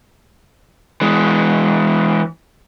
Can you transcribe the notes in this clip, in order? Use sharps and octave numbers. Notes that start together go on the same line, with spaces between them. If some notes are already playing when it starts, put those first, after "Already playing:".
E3 G#3